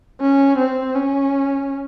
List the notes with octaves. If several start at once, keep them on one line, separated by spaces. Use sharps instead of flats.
C#4
C4
C#4